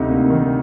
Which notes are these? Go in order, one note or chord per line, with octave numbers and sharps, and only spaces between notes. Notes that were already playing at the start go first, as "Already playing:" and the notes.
Already playing: D2 C3 D#4
A#3
D#3